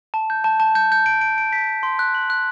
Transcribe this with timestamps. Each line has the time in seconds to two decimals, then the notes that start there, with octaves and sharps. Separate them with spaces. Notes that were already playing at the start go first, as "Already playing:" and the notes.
0.14 A5
0.30 G6
0.44 A5
0.60 A5
0.75 G6
0.92 G6
1.06 D7
1.21 D7
1.38 D7
1.53 B6
1.69 D7
1.83 C6
1.99 F#6
2.15 F#7
2.30 F#6